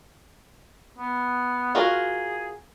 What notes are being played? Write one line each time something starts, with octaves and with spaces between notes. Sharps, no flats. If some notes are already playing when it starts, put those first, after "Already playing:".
B3
F4 F#4 G#4 A#4